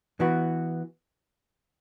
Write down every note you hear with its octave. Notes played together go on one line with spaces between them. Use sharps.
E3 B3 F#4